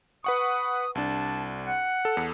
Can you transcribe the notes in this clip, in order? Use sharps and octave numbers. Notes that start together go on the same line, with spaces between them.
B4 F#5 C#6 D#6
C2 D4 A5
F#5
A4
E2 A4